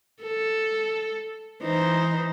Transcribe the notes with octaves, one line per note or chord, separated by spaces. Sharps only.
A4
E3 D#4 C5